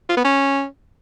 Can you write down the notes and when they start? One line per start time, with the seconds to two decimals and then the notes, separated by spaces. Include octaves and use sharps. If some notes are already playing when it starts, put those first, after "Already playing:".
0.09 F4
0.17 B3
0.24 C#4